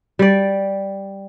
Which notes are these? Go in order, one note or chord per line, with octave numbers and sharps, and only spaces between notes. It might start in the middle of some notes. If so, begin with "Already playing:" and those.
G3 D5